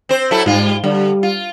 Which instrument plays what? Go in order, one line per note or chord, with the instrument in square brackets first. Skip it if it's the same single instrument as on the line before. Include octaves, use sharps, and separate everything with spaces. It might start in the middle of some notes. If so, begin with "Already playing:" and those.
[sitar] C4 C5
F#3 E4 A4
[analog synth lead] G#2 [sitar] G3 F4
[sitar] D3 [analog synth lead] G3
[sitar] F4